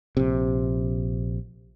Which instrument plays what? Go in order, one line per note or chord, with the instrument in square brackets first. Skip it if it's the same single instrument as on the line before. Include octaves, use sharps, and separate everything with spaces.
[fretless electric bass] A#1 C3